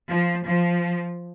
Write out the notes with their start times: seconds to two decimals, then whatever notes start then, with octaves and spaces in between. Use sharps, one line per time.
0.09 F3
0.46 F3